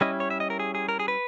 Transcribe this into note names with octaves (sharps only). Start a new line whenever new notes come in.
G3 C#4 E4 D#5
C#5
E5
D#5
A#4
G#4
G#4
A#4
G#4
B4